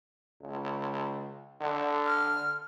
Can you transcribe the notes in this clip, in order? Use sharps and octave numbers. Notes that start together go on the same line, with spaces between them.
C#2
D3
F6